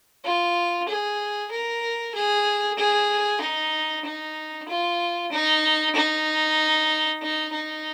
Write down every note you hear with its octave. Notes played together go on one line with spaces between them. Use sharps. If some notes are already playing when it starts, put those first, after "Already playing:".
F4
G#4
A#4
G#4
G#4
D#4
D#4
F4
D#4
D#4
D#4
D#4